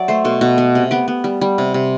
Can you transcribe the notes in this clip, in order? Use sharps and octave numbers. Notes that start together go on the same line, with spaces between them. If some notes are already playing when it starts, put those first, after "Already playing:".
Already playing: F#3 D5 E5
A3 C5
B2 A4
B2
B3
C3
B3 G4
B3
G3
G3
C3
C3